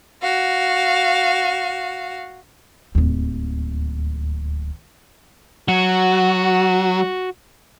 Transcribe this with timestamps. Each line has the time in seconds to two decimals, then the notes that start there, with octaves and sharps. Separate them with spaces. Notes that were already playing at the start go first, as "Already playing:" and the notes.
0.23 F#4 F5
2.95 D1 D#2
5.68 F#3 F#4